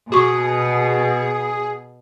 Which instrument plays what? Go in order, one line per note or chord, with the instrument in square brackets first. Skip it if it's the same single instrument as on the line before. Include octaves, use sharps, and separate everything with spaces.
[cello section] B2 [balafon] F#4 C#6 [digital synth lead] G#4